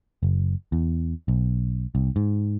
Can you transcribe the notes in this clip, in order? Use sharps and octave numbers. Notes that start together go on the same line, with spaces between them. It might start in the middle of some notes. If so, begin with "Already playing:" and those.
F#1
E2
B1
C2
G#2